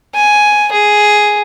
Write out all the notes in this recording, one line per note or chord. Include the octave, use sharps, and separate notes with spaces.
G#5
G#4